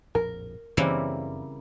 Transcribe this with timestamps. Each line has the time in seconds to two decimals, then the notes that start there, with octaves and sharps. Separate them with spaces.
0.15 A#1 F2 A2 A#4
0.77 F#2 C#3 E3 G3 A#3 C4 D4